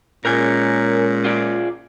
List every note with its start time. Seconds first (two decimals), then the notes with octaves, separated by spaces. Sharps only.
0.25 A#2 G#3 C#4 A#4 G#5
1.25 F4 G#4 D5